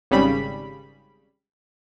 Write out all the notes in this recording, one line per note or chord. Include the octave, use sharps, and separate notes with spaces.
G#1 C#3 G3 B5